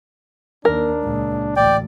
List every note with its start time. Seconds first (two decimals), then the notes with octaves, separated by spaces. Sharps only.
0.65 D#2 D4 A#4
1.02 C#2 A#2
1.56 A1 D2 D5 G5